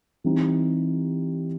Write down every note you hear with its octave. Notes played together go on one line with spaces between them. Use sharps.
E3 G3 C4 D#4